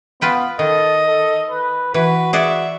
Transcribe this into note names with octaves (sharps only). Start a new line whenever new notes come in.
B3 F4 B4 G5
D#3 A4 D#5
A4
B4
E3 F#4 B4
G#4 D5 E5 F#5